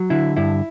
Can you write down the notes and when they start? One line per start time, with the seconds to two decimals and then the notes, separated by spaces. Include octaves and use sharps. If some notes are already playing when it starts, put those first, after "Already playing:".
Already playing: F#3
0.10 D3 E4
0.36 G2 E4